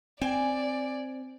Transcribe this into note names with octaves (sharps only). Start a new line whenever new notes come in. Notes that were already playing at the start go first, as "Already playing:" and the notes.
C4 D5 G#5